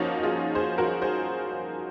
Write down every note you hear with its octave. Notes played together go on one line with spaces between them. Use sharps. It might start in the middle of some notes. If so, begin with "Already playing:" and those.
Already playing: F3 A#3 C#4 D#4 F4 F#4
F4 G#4
G#4 C5
F#4 A#4
G#4 C5